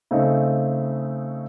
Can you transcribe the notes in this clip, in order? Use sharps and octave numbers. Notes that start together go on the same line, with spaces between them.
C#3 A3 C4 D#4